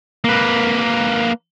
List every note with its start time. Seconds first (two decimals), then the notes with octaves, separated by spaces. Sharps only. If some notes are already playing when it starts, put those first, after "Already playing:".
0.24 A#3 B4